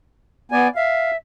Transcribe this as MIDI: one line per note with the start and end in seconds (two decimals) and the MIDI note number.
0.52 0.68 59
0.52 0.70 74
0.52 0.68 80
0.76 1.16 76
0.76 1.11 77